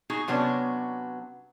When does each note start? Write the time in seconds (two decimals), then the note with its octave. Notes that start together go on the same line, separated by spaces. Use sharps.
0.10 D#4 F#4 G#4
0.28 C3 F#3 B3 C#4 D4